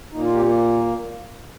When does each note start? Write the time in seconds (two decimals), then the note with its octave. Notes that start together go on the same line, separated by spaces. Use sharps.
0.12 A#2 A#3 D#4
0.23 F4
0.33 G4
0.39 C4
0.45 A#3